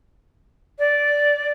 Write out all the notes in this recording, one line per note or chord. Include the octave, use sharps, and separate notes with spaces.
D5